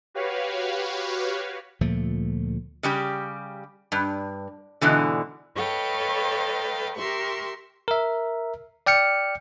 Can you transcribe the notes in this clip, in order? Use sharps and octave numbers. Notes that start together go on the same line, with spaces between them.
F#4 G4 B4 C#5 F5
D2 A#2 F3 A3
C#3 G3 G4
G2
G#2 B2 D3 E3
A4 B4 C#5 D#5 F5 G5
G4 A#4 E5 C6 C#6
A#4 E5
D5 G5 F6 C#7